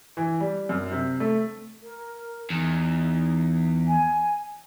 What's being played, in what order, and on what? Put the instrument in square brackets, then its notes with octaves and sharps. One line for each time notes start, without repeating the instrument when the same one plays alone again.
[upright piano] E3
G3
F#2
C3
A3
[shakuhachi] A#4
[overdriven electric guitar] E2 [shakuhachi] D#4
[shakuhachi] G#5